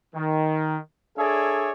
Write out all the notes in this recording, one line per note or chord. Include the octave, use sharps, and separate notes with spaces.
D#3
D4 G#4 A4 C#5 D5 E5